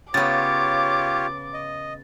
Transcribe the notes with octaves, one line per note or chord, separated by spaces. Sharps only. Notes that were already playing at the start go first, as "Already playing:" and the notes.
C#3 B3 F4 G4 C#5 D6 A6
D#5